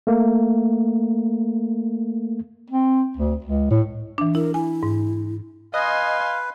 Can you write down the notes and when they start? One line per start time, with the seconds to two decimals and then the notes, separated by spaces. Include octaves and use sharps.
0.07 A3 A#3
2.70 C4
3.17 D2
3.44 C#2
3.71 A2
4.18 E3 D4
4.35 E4 A#4
4.54 E4 G#5
4.83 G#2
5.74 B4 D#5 F5 G#5 C6